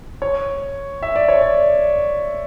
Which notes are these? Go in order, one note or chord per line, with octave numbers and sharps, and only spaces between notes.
C#5
E5
D5
C#5
D5